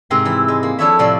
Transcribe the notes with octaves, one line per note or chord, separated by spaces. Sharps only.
G#2 C3 C4 A#4 C6
E3 E4
G#3
A#3
F3 D4 E4 A4 C#5 E5
A2 C3 F3 D5 C6